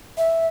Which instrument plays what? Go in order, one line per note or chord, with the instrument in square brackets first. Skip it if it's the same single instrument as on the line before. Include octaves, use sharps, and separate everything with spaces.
[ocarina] E5